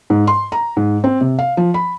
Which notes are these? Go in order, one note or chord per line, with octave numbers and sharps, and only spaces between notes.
G#2
C6
A#5
G#2
C4
C3
F5
F3
B5